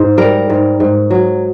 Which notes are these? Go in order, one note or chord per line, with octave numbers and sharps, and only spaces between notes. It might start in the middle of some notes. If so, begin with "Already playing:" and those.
Already playing: G#2 C5
G3 A#4
G#2
G#2
F#3